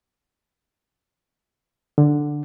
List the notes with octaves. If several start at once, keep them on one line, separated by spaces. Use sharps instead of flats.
D3